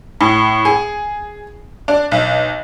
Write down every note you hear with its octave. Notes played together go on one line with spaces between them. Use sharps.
A2
G#4
D4
B1